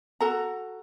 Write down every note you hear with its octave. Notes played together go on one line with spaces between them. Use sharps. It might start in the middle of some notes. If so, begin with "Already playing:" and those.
F#4 A4 A#5